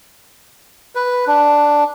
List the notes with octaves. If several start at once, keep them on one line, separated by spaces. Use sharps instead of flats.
B4
D4